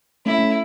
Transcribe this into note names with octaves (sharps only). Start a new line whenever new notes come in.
A3 C#4 E4
A3 C#4